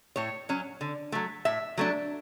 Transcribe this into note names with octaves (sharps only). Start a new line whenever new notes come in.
A2 C#5
F#3 C#4
D3
F#3 A3
A2 E5
F#3 A3 D4